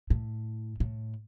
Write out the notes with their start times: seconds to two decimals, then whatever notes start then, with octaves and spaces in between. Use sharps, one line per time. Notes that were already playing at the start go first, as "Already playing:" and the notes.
0.10 A2
0.80 A2